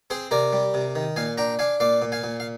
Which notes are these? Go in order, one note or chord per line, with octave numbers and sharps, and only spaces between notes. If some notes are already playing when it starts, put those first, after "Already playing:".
C4 G#4 C5
C3 A#4 D5
G3
C3
D#3
A#2 F5 G#5
D4 G5 A#5
D4 F5 G#5
A#2 D5 F5
A#2
F5 G#5
A#2
F5